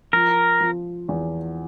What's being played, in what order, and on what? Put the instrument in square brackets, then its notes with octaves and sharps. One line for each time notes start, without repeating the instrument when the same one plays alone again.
[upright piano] F3 [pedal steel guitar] A#4
[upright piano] F3
E2